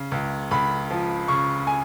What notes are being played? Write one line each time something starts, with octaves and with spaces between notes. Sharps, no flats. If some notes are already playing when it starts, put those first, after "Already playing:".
Already playing: C#3
C#2
C#2 B5
F3
C#3 C#6
G#5